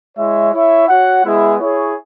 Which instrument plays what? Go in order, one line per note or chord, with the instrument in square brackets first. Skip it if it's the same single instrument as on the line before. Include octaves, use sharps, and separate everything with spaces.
[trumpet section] G#3 E4 C#5 E5
E4 C#5 E5
F#4 C#5 F#5
G#3 B3 E4 G#4
E4 G#4 C#5